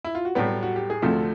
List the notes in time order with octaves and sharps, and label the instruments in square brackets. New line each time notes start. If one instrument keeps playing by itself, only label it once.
[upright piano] E4
F4
F#4
[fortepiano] A2 F#3 B3 [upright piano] G3 G4
[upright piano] F#4
G4
G#4
[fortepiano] D2 C3 F3 [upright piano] A3 A4